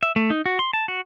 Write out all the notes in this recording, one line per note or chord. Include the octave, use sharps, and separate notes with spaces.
E5
A3
D#4
F#4
C6
A5
F#4